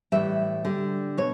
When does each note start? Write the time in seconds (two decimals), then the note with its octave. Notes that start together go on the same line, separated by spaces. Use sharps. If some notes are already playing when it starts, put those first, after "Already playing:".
0.12 A2 E3 G3 E5
0.65 D3 G3
1.17 B2 C#5